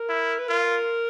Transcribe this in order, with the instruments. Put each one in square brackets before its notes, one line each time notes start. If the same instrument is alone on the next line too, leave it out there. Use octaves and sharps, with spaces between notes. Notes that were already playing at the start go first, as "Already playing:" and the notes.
Already playing: [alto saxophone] A#4
[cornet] E4
[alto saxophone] B4
[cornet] F4 [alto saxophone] A#4